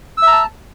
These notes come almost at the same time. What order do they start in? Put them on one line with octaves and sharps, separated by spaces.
E6 E5 A#5 A5